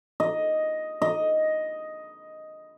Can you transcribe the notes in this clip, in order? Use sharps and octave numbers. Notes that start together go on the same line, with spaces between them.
D#5
D#5